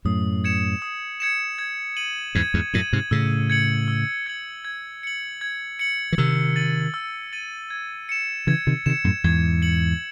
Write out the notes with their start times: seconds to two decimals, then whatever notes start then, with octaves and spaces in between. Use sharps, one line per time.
0.05 F#2 A2 D#6
0.44 G#6 C#7 E7
0.82 D#6
1.20 G#6 C#7 E7
1.58 G#6
1.97 D#7 F#7
2.35 E2 G#2 G#6
2.54 E2 G#2
2.74 F#2 A2 D#7 F#7
2.93 G#2 C3
3.11 A2 C#3 E6
3.50 G#6 C#7 F#7
3.88 E6
4.26 G#6 C#7 F#7
4.65 G#6
5.03 C#7 F#7
5.41 G#6
5.79 C#7 F#7
6.12 E3
6.18 C3 D#3 E6
6.56 A6 D#7 F#7
6.94 E6
7.33 A6 D#7 F#7
7.70 G#6
8.09 C#7 E7
8.47 C#3 E3 G#6
8.67 C3 D#3
8.86 C3 D#3 E7
8.90 C#7
9.04 F#2 A2
9.24 E2 G#2 G#6
9.62 C#7 F#7